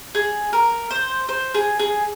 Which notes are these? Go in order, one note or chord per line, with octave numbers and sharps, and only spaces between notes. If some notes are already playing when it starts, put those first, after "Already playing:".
G#4
A#4
C5
C5
G#4
G#4